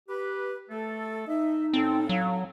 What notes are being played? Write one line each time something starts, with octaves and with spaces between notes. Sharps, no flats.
G4 B4
A3 A4
D#4 D#5 E5
A2 C4 C#4 A4
F#3 F5